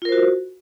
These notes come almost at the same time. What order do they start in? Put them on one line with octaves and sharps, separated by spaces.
F4 A#4 C5 F#4